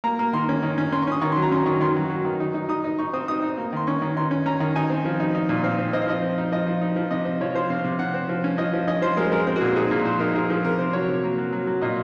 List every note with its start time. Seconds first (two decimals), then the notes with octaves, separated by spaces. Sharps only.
0.04 A#3 A#5
0.19 A#3
0.33 D#3 C6
0.49 C#4
0.63 D#3
0.78 C#4
0.92 C#4 C6
1.02 C#6
1.07 C#4 D#6
1.21 D#3 C#6
1.32 F#3 C6
1.42 A#5
1.52 C#4 C6
1.66 D#3 C#6
1.81 D#3 C6
1.96 F#3
2.10 F#3
2.25 D#3
2.40 D#4
2.54 D#4
2.69 D#4 D#6
2.84 D#4
2.99 D#4 C#6
3.13 C4 D#6
3.28 D#4 D#6
3.42 D#4
3.57 A#3
3.73 D#3 C6
3.87 C#4 C#6
4.02 D#3
4.16 D#3 C6
4.31 C#4
4.46 C#4 A#5
4.60 D#3
4.76 D#4 G#5
4.90 C4
5.05 F3
5.20 D#4
5.35 D#4
5.49 A#2
5.64 C4 F5
5.78 C4
5.93 C4 D#5
6.02 F5
6.07 F3 D#5
6.22 C4
6.38 D#4
6.52 F3 D#5
6.66 F3
6.81 D#4
6.96 F3
7.11 C3 D#5
7.25 C4
7.40 F3 C#5
7.55 F3 C5
7.70 C3 F5
7.84 C3
7.99 C3 F#5
8.14 C4
8.29 F3
8.44 C#4
8.58 F3 D#5
8.73 F3
8.88 C#4 D#5
9.02 F3 C5
9.17 G#3 A#4
9.32 G#3 A#4
9.47 C4
9.56 F#4
9.61 A#2 G#4
9.76 D#4 G#4
9.91 A#2
10.05 F3 C5
10.20 D#4 A#4
10.35 D#4 G#4
10.50 F3 G#4
10.64 C3 A#4
10.79 C3 C5
10.93 F#3 C#5
11.08 C3
11.24 A#3
11.38 F#3
11.53 F#3
11.67 F#3
11.81 A#2 D#5